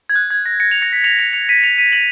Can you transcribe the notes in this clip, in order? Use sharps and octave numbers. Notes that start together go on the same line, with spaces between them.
G#6
F#6
G#6
A#6
A#6 C#7
C#7 F7
A#6 C#7
B6
C#7 F7
C#7 F7
C#7 F7
B6 D#7
C#7 F7
B6 D#7
D#7 F#7